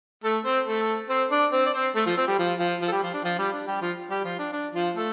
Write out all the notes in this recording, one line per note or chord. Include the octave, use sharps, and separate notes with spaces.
A3 A4
C4 C5
A3 A4
C4 C5
D4 D5
C4 C5
D5
C4 C5
A3 A4
F3 F4
C4 C5
G3 G4
F3 F4
F3 F4
F3 F4
A4
G3 G4
F3 F4
D4
F3 F4
G3 G4
D4
G3 G4
F3 F4
G3 G4
F3 F4
D4
D4
F3 F4
A3 A4